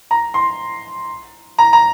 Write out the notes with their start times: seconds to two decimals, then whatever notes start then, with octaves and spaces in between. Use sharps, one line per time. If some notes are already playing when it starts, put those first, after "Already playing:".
0.11 A#5
0.34 C6
1.59 A#5
1.73 A#5